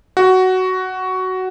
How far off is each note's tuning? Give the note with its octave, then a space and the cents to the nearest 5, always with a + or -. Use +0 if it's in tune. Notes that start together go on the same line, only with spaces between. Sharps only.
F#4 +10